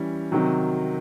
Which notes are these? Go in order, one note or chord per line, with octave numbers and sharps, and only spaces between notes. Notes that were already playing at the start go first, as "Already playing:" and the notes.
Already playing: E3 G3 C#4
C3 D#3 F#3